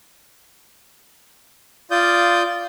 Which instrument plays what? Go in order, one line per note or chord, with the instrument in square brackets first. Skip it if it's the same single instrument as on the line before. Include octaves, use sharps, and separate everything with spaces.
[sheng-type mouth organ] F4 D5 D#6 G6